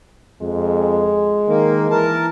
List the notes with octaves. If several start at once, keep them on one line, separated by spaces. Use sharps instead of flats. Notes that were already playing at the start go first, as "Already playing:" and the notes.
F2 G#3
D#3 A#3
E3 A#4 A5